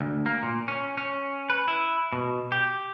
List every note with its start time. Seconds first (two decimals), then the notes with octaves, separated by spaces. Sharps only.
0.01 D2
0.26 A#3
0.43 A#2
0.68 C#4
0.97 C#4
1.50 B4
1.68 E4
2.13 B2
2.52 G4